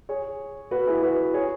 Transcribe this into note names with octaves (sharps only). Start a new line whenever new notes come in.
G#4 C#5
F#4 B4
E4 G#4
F#4 B4
G#4 C#5